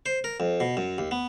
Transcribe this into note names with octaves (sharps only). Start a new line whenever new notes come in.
C5
A#4
F2
B2
F#2
D#2
B3